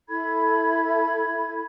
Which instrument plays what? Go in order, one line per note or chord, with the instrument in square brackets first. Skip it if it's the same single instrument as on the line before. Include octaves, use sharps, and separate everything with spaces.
[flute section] E4 A4 B5 G#6